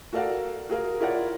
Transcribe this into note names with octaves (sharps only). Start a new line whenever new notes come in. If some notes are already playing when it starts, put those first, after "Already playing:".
F#4 A4 A#4 D5 F5 F#5
F#4 G#4 A#4 F5
E4 F4 A#4 C#5 D5 F#5